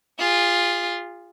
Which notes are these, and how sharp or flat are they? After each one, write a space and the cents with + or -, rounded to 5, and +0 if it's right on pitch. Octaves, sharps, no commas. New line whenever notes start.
F4 +0 G#4 -35